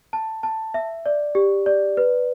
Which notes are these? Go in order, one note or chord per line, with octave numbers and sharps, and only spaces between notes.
A5
A5
E5
D5
G4
D5
B4